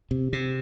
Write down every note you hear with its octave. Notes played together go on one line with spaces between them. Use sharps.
C3
C3